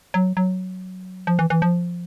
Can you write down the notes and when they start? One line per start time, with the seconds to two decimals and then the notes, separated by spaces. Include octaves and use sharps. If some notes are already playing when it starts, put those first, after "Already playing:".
0.14 F#3
0.37 F#3
1.27 F3
1.39 E3
1.50 E3
1.62 F3